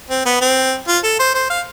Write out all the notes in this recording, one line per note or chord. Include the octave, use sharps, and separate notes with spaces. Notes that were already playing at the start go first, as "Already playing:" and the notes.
C4
B3
C4
F4
A4
C5
C5
F5